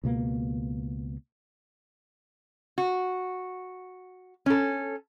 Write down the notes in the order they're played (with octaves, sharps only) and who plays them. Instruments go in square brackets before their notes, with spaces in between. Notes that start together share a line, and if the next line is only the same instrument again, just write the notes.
[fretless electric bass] C#2 B2 A#3
[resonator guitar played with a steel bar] F#4
C#4 A4